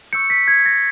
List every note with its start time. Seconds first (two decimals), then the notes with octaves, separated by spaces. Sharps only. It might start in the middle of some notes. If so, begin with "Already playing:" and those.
0.13 C#6 E6 G6 C#7
0.30 B6
0.48 G#6
0.66 A#6